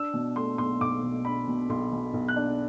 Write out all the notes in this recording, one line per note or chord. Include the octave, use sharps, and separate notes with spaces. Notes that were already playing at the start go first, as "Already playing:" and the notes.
Already playing: D4 E6
B2
A3 C6
B1 C6
B1 D6
B2
D4 B5
B2
B1 C6
B2
B1
F#6
D4